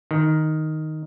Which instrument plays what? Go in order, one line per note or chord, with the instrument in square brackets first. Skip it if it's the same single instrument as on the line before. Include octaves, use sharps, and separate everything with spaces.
[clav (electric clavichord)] D#3